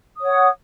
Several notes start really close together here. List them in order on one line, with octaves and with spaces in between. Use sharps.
D#6 C#5 F#5